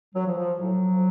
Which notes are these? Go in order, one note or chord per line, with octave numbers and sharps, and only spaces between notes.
F#3
F3
F3
A2 F#3
F3